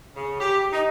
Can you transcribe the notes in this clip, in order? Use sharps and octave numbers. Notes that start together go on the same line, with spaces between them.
C#3
G4
D#4